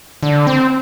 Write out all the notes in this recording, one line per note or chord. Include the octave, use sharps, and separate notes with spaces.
D3
C4